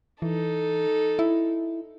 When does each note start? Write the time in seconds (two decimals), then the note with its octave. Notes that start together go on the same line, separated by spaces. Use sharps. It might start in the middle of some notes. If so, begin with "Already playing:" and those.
0.22 E3 D#4 A4
1.19 E4